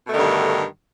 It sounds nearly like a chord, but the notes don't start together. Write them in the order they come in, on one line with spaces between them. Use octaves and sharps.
B2 A3 D#3 D3 G2